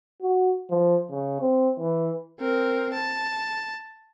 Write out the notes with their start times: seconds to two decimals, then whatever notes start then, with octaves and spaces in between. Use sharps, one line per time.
0.22 F#4
0.70 F3
1.10 C#3
1.41 C4
1.79 E3
2.39 C4 A#4
2.94 A5